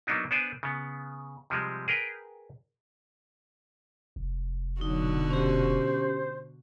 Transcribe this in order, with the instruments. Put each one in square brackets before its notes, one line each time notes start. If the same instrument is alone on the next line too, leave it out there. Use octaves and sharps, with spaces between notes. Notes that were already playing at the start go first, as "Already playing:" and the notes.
[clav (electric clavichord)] F#3 A#3 B3 D4 D#4
B3 D4 C5 D5 G#5
C#3 B3
C3 F3 G3 G#3
G#4 A#4 B4 G5
[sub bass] F1
[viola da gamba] B2 D3 F#4 [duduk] F#3 [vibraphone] D#4
[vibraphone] C#4 G4 [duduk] C5